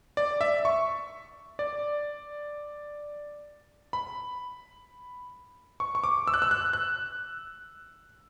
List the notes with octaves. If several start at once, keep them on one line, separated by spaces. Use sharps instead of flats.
D5
E5
C#6
D5
B5
C#6
C#6
D6
E6
F#6
E6
F#6
F#6